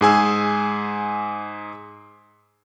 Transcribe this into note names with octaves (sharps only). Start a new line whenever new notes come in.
G#2 G#4 G#5 E6